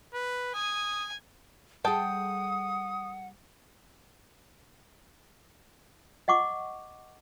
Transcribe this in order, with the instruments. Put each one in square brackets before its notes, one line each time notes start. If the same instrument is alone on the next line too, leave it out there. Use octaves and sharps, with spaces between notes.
[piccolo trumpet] B4
[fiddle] G#5 [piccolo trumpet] D#6
[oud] G3 G#4 [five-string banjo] A4 G5 A5 [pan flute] F#5 [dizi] D#6
[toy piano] D#5 F#5 C#6 D6